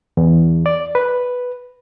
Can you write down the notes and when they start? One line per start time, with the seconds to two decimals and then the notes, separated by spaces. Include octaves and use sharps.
0.17 E2
0.66 D5
0.95 B4